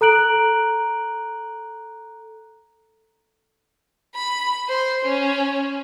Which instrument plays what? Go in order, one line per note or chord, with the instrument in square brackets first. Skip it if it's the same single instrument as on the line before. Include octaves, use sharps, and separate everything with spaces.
[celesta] A4 A#5 F#6 D7 F#7
[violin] B5
C5
C#4